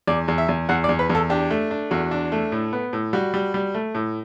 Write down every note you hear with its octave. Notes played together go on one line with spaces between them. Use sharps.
E2 D5
E2
E5
E2
E2 F#5
D5
E2
B4
E2
A4
D4 G4
A3
D4
E2 F#4
D4
A3
A2
B3
A2
G3 F#4
G3
G3
A3
A2